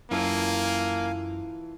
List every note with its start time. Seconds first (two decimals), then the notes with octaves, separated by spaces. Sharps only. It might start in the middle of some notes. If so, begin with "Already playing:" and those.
0.11 F#2 E3 A#3 F4 A4 F5 G#5